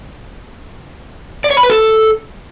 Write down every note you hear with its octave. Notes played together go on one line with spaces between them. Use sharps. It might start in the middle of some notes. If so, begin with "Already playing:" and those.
D5
C#5
B5
B4
A4